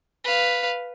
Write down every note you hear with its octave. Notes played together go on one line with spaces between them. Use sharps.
B4 F5